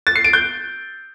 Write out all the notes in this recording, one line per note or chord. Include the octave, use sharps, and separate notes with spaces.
A6
C7
D7
G6